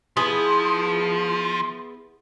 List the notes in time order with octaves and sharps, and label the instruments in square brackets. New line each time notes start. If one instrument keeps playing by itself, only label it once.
[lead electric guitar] F3 [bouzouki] B3 E4 G#4